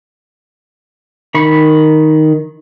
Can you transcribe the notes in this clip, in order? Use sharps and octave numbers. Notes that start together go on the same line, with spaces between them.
D#3 B5 C#6